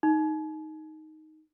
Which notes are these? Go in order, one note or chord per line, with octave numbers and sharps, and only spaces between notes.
D#4